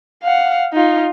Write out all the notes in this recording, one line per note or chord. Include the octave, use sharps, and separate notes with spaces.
F5 F#5
D#4 F4